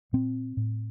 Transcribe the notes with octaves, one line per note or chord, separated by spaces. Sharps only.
A#2 C4
A2